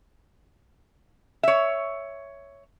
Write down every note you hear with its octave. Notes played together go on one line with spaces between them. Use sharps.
C#5 E5